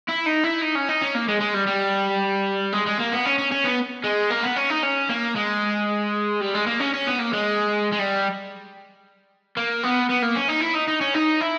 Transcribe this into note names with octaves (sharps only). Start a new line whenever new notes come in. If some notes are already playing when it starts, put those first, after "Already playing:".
E4
D#4
E4
D#4
C#4
D#4
C#4
A#3
G#3
G#3
G3
G3
G#3
G#3
A#3
B3
C#4
C#4
C#4
B3
G#3
A#3
B3
C#4
D#4
C#4
A#3
G#3
G3
G#3
A#3
C#4
C#4
B3
A#3
G#3
G#3
G3
A#3
B3
B3
A#3
C#4
D#4
E4
D#4
D#4
C#4
D#4
E4